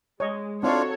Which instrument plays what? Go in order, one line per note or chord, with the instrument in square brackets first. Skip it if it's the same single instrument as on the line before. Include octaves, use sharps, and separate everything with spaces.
[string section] G#3 [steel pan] C#5 D#5
[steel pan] C4 D#4 F5 [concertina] D4 F4 [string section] F#4 A4 C#5